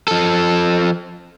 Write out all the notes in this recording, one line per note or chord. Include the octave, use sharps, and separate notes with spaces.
F3 A4